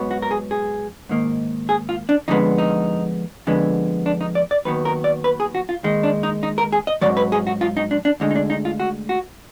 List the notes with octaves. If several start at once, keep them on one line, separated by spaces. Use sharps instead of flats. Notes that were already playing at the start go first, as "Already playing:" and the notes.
Already playing: G#2 F#3 B3
F#4
A#4
G#4
G#4
G#2 D#3 A#3
G#4
F4
D4
F2 D3 G#3 B3 D#4
D#4
F2 D3 G#3 B3
D4
D#4
D5
D5
D#2 D#3 F#3 B3 B4
A#4
D5
B4
G#4
F#4
F4
D#2 D#3 G#3
D4
D#4
D#4
A#4
G#4
D#5
G#2 D#3 F#3 D5
B4
G#4
F#4
F4
D#4
D4
D4
D2 D3 G#3 D#4
D#4
D4
D#4
F4
F#4
F#4